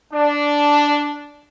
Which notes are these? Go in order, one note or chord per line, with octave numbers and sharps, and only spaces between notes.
D4